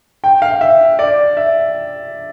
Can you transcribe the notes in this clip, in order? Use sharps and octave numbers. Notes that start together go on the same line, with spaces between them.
G5
F5
E5
D5
E5